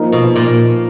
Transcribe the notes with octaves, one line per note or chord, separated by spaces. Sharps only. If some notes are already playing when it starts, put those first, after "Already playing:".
Already playing: F3 A#3 D#4 A#4
B2
A#2